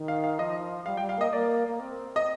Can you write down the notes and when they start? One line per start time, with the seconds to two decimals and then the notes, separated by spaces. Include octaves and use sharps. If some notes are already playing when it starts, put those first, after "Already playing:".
Already playing: D#3
0.08 F5
0.24 F5
0.39 F3 D#5
0.85 G3 F5
0.97 G5
1.01 G3
1.09 F5
1.17 A#3 D#5
1.32 A#3 D5
1.68 A#3
1.79 C4
2.16 D#5